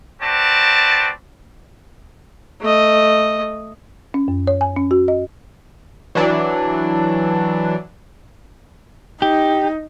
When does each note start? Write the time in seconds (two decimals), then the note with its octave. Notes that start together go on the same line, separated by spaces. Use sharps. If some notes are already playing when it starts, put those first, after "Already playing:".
0.22 C4 F#4 B4 D5 A5
2.61 A3 D#5
4.14 C#4
4.28 F#2
4.47 C#5
4.61 G#5
4.77 C#4
4.91 F#4
5.08 D#5
6.15 E3 F#3 D4
9.22 D#4 G4